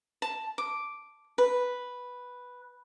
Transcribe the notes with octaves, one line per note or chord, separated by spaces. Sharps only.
A5
D6
B4